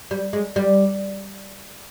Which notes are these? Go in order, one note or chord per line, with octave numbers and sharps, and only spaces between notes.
G3
G#3
G3